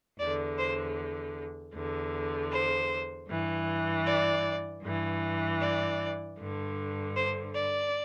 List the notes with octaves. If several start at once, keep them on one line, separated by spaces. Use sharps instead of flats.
E2 D3 D5
C5
E2 D3
C5
G2 E3
D5
G2 E3
D5
G2 D3
C5
D5